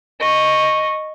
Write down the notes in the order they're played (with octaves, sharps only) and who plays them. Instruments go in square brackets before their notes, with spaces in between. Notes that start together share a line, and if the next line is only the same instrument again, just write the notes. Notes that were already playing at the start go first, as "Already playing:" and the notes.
[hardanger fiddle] D#5 C#6